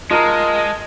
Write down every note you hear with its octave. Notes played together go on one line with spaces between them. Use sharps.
G#3 F4 A#4 D#5 A5